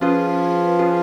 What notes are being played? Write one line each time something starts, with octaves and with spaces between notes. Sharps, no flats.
F3 C#4 F4 G#4 B4
C#4 F4 G#4 B4